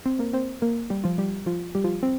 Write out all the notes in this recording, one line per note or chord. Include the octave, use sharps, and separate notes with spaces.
C4 C5
A#3 A#4
C4 C5
A#3 A#4
G3 G4
F3 F4
G3 G4
F3 F4
G3 G4
F3 F4
C4 C5